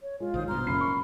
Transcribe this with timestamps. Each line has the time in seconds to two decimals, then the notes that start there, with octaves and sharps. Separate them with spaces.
0.02 C#5
0.20 G#3 F4
0.34 A#1 D#3 C5 D#6
0.48 G2 B2 A#5 C6 D6 F6
0.67 F#1 C#4 B5 C7
0.81 C#6